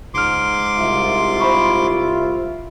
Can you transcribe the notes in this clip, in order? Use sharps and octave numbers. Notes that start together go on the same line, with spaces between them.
C#2 G#2 C6 D6 F6
C2 F4 E5
C5 B5 C#6